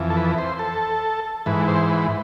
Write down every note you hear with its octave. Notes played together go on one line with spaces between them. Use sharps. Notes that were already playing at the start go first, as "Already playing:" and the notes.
Already playing: F2 E3
A4
B4
C5
A4
G#2 E3 B4
C5
B4